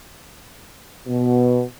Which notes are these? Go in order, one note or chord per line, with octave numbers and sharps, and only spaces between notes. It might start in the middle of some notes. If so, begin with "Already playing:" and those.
B2